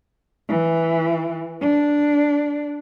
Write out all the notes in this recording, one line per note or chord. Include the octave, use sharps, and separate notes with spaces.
E3
D4